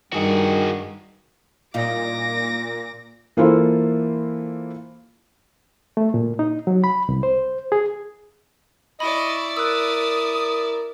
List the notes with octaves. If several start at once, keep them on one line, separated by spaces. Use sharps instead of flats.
G2 D#3 F#4 G#4
A#2 G3 D#4 F4 D6 A#6
E3 A#3 E4 F4 A4 C5
A3
A#2
D#4
F#3
B5
C2
C5
G#4
E4 D5 D#5 B5 C#6
A#4 D#6 E6 F#6